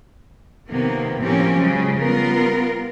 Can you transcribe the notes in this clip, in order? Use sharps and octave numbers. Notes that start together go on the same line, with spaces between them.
C3 D#3 F3 A#3 B3
A2 F3 A#3 C4 C#4 G4
C#3 F3 F#3 G#3
G3 B3 F4 A#4